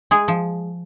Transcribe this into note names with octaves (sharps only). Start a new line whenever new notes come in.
G#3 G#4
F3